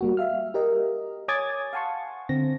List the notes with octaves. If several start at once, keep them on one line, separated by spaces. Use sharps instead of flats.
G3 A#3 F#4
E5 F5 F6
G4 A#4 D#5
C#5 G#5 D6 D#6 G#6 A6
F5 F#5 G#5 A5 C6 C#6
D3 C4 A#6